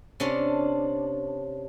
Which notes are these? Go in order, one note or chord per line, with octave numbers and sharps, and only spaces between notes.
C3 C#4 D4